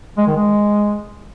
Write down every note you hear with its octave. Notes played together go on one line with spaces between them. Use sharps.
G#3
D#3
G#3